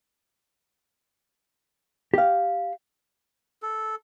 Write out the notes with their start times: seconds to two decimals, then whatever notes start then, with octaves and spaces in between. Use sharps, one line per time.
2.14 G4 F5
3.62 A4